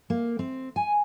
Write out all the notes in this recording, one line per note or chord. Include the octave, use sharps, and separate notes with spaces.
A#3
C4
G#5